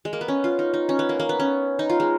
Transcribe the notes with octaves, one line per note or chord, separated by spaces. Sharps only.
G#3
A#3
B3
C#4
F4
D#4
D#4
C#4
B3
A#3
A#3
B3
C#4
D#4
F4
G#3